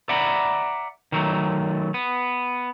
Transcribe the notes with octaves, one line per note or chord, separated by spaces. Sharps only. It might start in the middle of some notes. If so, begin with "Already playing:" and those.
D5 E5 F#5 A#5 B5
D#3 F#3 A3
B3